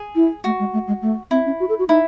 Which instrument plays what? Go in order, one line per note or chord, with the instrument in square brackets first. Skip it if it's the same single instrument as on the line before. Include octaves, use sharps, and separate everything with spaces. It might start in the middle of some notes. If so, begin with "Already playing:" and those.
Already playing: [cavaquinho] G#4
[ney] E4
[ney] A3 [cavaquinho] F#4
[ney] G#3
A3
G#3
A3
[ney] C4 [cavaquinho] E4
[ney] C#4
F#4
A4
F#4
[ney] D#4 [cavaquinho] E4